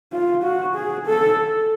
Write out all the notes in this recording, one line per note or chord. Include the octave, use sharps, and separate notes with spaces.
F4
F#4
G#4
A4